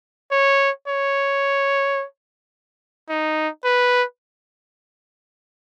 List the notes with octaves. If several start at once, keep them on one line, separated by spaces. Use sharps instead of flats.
C#5
C#5
D#4
B4